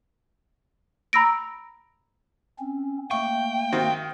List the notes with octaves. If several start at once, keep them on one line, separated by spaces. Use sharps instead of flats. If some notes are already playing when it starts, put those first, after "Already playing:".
A#5 B5 E6 A#6 D7
C4 C#4
A3 A#3 G5 C#6
D#3 C4 F#4